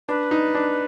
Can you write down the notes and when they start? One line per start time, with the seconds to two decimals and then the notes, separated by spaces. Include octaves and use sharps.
0.08 D4 B4
0.31 D#4
0.55 D4